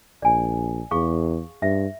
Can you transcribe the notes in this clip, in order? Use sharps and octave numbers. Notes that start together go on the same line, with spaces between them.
A#1 D5 G#5
E2 G#4 F5 C#6
G2 E5